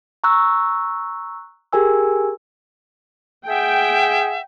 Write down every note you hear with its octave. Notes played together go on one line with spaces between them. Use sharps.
A#5 C#6 E6 F#6
G4 G#4 A#4 G#5 E6
G#4 E5 F#5 G5